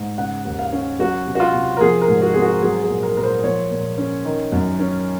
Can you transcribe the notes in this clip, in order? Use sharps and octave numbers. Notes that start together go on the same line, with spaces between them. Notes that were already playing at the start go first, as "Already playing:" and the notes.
Already playing: G#2
C#3 F#5
D#2
F5
C#4
F#3 F#4
C3
F#4
F4
C3
A#4
F3 G#4
A#4
G#2
F#4
C4 G#4
F#4
F#3 G#4
G#4
A#2
A#4
A#2 A#4
C5
F3 C#5
A#2
C#4
D#3
F#2
C#4